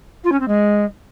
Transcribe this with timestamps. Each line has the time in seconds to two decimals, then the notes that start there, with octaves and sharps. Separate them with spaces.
0.24 F4
0.32 C#4
0.40 C4
0.48 G#3